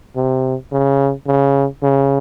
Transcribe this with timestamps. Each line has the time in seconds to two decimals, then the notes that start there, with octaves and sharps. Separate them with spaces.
0.16 C3
0.72 C#3
1.27 C#3
1.83 C#3